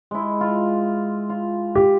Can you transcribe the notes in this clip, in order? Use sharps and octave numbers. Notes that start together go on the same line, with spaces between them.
G#3 E4
F4
F4
G4